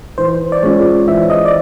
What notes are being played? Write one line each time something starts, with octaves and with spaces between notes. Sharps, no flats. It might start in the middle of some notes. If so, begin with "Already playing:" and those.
E3 C5
D5
G#3 C#4 F4 C#5
E3 E5
D#5
D5